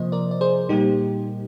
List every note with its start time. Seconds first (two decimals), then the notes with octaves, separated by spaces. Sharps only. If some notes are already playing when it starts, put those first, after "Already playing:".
Already playing: C3 F3 A#3 C5 D#5
0.12 A#4 D5
0.31 D5
0.41 G#4 C5
0.69 A#2 G3 A#3 D#4 G4